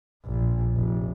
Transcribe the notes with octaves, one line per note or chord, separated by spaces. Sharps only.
A#1
F1